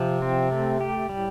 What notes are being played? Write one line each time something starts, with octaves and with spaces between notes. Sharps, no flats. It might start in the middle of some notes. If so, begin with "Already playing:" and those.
Already playing: C3 F3
C4
A3
G4
A2 G3